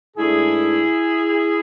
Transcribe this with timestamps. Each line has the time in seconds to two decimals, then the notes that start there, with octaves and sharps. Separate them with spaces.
0.16 G#2 E3 A3 D4 E4 G#4